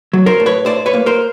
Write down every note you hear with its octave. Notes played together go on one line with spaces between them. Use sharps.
F#3
A#4 C5
A2
B4 C#5
A2 C5 D5
B4 C#5
A#3
A#4 C5